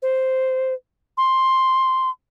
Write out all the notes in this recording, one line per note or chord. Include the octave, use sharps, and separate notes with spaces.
C5
C6